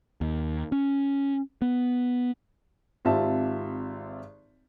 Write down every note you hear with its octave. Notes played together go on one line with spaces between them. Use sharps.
D#2
C#4
B3
G#1 C4 F4 G4 E5 A5